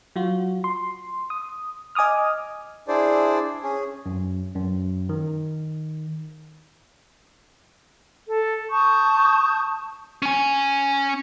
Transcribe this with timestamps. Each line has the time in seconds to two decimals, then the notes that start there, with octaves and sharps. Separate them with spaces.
0.16 F#3 F4 F#4
0.64 C6
1.30 D#6
1.95 D#5 G#5 D6 D#6 F6
2.88 D4 E4 G#4 C5 D5
3.63 C#4 G#4
4.06 F#2
4.55 F#2
5.09 D#3
8.28 A4
8.70 A5 C#6 D#6 G6
10.22 C#4 G#5